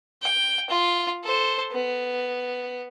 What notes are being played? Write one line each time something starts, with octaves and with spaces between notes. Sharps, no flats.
G5
F4
A4 C5
B3